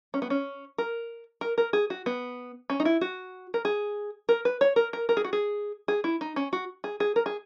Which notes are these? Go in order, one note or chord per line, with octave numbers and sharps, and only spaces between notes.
C#4
B3
C#4
A#4
A#4
A#4
G#4
F#4
B3
C#4
D#4
E4
F#4
A#4
G#4
A#4
B4
C#5
A#4
A#4
A#4
G#4
F#4
G#4
G#4
E4
D#4
C#4
F#4
G#4
G#4
A#4
G#4